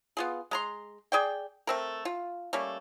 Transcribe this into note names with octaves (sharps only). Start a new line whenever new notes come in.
B3 F4 G#4
G#3 A#5 C6
G#4 D5 G5
A3 C4 A#4
F4
G3 A3 A#3 C#4